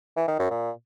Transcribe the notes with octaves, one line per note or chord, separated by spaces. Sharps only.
E3
D#3
F#2
A#2